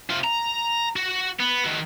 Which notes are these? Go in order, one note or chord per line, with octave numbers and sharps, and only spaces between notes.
C3 F4
A#5
F#4
B3
D#3 F#4